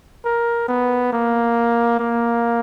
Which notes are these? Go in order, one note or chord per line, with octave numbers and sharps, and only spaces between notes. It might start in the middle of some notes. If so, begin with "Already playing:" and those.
A#4
B3
A#3
A#3